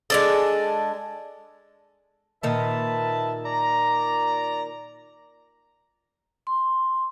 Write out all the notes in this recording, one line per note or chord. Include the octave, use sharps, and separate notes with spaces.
G#3 D4 A4
A#2 D#3 B4 E5 A5
D5 A#5
C6